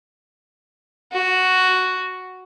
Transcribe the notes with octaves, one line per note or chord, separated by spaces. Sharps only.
F#4